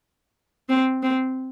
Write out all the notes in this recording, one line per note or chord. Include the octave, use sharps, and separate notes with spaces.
C4
C4